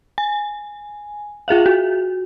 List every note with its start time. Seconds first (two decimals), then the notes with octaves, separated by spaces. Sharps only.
0.18 G#5
1.48 F4 G#4 E5 F5
1.66 F#4